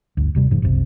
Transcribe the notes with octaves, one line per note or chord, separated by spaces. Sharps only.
G1 D2
D#1 C3 G3
F1 G#2 C#3 F3
F#1 C2 C3